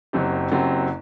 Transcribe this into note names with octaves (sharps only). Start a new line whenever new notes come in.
F#1 F#2 F#3 C4 G4
F#1 F#2 F#3 C4 G4